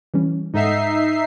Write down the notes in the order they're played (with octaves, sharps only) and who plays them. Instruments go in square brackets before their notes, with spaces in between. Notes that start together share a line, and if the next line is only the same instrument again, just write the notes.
[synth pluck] E3 G3 C#4
[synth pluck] G#2 A4 F#5 [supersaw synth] D#4 E5 C7